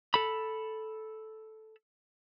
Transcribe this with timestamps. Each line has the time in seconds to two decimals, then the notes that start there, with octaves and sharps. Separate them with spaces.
0.14 A4 B5